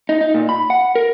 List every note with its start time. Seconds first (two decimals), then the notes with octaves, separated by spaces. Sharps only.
0.09 D#4
0.21 D#4
0.34 A#2
0.49 B5
0.70 F#5
0.95 A#4